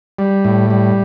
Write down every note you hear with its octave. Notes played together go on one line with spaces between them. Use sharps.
G3
A2
G3